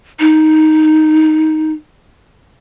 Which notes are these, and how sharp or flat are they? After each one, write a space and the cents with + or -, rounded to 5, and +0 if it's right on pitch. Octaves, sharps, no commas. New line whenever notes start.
D#4 +5